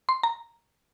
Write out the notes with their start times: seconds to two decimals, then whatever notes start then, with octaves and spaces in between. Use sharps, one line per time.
0.09 C6
0.23 A#5